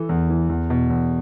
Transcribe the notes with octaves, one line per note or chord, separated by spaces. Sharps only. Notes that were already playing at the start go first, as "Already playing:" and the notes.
Already playing: E3 A4
E2
E3
E2
B2
E2